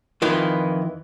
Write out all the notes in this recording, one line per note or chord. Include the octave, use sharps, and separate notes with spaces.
F2 D#3 E3 E4 F4